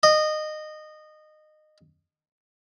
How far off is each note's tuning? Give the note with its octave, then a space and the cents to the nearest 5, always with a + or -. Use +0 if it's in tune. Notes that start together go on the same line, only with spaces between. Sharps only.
D#5 -20